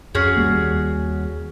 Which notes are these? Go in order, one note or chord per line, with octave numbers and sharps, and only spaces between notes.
F2 C#4 F#4 G#4
D#2 G3 A#3